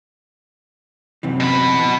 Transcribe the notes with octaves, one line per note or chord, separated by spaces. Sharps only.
F#2 C3 E3
B2 B5